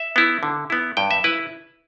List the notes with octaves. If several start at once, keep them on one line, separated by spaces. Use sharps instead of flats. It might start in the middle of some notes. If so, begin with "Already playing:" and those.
Already playing: E5
B3 E4
D3
B3 E4
G2 G5
E5
E4 B4